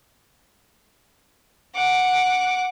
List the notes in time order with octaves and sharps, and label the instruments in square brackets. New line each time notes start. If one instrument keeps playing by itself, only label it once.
[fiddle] F#5 D6